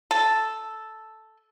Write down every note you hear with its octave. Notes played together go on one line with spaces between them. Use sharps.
A4